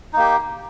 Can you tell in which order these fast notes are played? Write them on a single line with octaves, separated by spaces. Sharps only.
D#4 A#3 G4